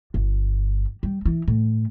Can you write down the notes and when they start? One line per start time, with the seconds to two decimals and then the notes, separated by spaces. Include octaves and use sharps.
0.14 G1
1.03 G3
1.25 E3
1.48 A2